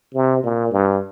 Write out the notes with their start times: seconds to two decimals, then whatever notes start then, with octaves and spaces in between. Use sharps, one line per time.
0.14 C3
0.43 A#2
0.72 G2